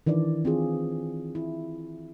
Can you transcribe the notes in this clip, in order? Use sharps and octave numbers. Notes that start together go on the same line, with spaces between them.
D#3 E3 D4 D5
C4 F4 G#4
E4